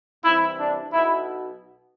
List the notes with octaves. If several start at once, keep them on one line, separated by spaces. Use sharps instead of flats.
C2 C3 E3 E4
D4
B1 B2 E4